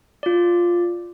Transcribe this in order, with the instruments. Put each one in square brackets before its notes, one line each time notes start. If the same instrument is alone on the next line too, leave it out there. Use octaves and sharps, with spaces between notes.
[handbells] F4 D5